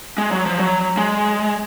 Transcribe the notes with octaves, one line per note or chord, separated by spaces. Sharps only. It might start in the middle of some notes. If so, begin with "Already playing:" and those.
G#3
F#3
F3
F#3
G#3